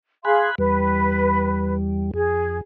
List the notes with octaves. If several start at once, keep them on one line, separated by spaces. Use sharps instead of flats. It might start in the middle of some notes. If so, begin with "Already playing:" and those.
G#4 F5 G#5 B5 C6 F#6
E2 G3 B4
F2 G#4